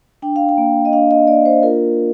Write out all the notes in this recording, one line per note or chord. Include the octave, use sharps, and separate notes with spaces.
D4 G5
F5
G5
A#3
D#5
D4 F5
D#5
A#3 D5
C5
F4 A#4